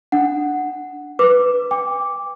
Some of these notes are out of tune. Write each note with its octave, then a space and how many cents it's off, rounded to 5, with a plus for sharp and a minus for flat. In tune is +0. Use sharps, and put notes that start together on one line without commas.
D4 +0 F#5 +0
B4 +0 D6 +0
G5 +40 D6 -5